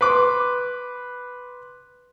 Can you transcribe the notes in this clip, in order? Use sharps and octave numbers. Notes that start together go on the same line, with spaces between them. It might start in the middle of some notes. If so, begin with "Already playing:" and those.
B4 C6 D6